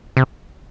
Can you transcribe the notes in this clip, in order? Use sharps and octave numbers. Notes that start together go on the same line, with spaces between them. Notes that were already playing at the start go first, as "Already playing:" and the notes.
C3